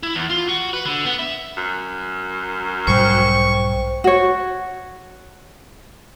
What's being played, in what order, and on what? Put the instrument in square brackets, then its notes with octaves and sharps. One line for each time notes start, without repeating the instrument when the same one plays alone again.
[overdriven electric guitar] E4
E2
F4
F#4
B4
D3
B3
E5
[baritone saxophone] F#2
[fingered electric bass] B1 G#2 G3 [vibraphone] C5 G5 [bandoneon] C#6
[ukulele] F#4 C#5